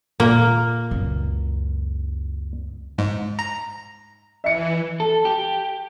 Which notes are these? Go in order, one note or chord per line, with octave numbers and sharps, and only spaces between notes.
A#2 A#3 F5
C#2 F#2
G#2
A#5
E3 E5 C#7
A4
G4